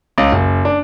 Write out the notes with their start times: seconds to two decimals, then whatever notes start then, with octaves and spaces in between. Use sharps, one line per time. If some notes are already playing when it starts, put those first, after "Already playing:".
0.18 C#2
0.32 F#1
0.65 D4